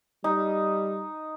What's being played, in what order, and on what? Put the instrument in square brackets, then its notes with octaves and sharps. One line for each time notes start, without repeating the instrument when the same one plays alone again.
[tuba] G3 [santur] D#4